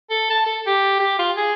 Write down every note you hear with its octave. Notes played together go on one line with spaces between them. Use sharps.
A4
A5
A4
G4
G4
F4
G#4